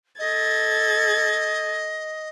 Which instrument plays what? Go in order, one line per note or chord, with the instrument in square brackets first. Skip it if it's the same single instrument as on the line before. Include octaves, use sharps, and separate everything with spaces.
[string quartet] A4 G#6 A6 [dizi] D#5